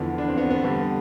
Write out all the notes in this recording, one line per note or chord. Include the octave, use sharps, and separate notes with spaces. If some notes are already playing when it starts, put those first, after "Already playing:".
Already playing: E2 D3 F3 B3
D4
C4
B3
B3
G2 D3 G3